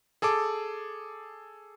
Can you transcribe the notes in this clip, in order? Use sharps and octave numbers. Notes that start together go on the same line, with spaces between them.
G#4 A4 A5 D6